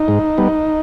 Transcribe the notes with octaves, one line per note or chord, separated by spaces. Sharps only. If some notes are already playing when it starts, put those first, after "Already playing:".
Already playing: D#4
G#2
G3 B3